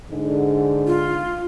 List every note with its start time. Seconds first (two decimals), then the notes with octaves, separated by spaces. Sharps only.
0.11 G#2 D3
0.87 F4